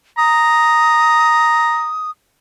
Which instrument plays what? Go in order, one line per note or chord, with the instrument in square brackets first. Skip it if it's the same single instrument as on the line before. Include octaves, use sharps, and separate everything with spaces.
[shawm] A#5 [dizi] D#6